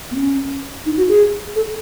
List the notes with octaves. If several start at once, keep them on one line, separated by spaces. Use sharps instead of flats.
B3
C#4
D#4
F#4
G#4
A4